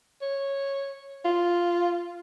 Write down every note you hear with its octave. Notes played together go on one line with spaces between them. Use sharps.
C#5
F4